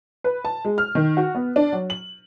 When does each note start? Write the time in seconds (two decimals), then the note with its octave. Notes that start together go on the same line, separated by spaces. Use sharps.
0.24 B4
0.45 A5
0.65 G#3
0.78 F6
0.95 D#3
1.17 F#4
1.35 B3
1.56 D4
1.73 F#3
1.90 F#7